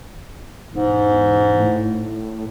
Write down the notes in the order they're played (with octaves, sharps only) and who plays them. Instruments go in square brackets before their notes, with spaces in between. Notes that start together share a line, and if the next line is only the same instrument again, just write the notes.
[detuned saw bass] E1 [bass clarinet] G#2
[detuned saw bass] A2